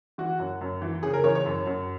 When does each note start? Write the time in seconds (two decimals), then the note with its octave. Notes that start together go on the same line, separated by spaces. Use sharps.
0.18 E3 F#4
0.39 F#2
0.61 F#2
0.82 E3
1.03 C#3 G#4
1.14 A#4
1.24 E3 C#5
1.35 C#5
1.46 F#2
1.67 F#2